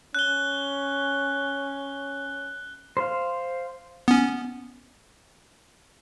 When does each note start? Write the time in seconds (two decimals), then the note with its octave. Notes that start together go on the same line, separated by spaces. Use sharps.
0.14 C#4 F#6 G7
2.97 C5 F5
4.08 B3 C#4